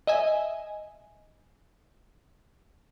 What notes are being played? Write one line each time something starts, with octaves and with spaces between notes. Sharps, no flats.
D#5 E5 G#5